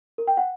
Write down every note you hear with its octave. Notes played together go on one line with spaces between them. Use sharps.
A#4
G5
F#5